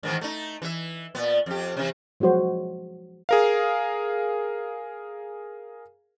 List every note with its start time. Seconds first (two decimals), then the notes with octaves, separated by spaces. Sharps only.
0.03 G#2 D#3 E3
0.21 A3 D#4
0.62 E3 E5
1.15 A#2 B3
1.46 F2 G4
1.77 C3 E3
2.20 F3 F#3 G#3 F#4 C5
3.29 G#4 A#4 F5